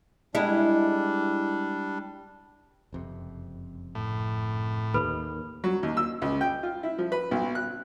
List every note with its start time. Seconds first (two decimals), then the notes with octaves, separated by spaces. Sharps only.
0.35 G3 G#3 D4 E4
2.93 F#1 F2 C3
3.95 A2
4.94 D#2 A4 B4 B5
5.64 F#3
5.83 D#2
5.97 E6
6.22 C#2
6.41 G5
6.63 F4
6.83 E4
6.98 F3
7.12 B4
7.31 B1
7.55 F#6